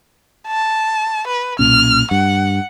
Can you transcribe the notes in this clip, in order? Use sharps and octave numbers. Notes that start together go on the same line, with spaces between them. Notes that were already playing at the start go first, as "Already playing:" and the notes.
A5
B4
B1 A#2 C#4 F6
G2 F#5